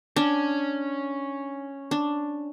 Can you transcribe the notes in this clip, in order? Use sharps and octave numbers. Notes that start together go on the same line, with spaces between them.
C#4 D4
D4